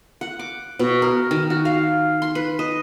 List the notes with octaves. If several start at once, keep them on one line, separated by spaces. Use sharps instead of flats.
F#5
D6
B2
A#4
D#3
F#4
F5
C6
B4
D#5